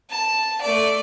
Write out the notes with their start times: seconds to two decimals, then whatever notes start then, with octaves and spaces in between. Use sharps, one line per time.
0.10 A5
0.61 A3 D5